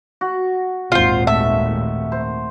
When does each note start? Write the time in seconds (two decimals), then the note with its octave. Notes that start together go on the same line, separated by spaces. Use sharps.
0.21 F#4
0.92 G#1 D#2 A#2 F4 C5
1.27 A3 E5
2.12 C5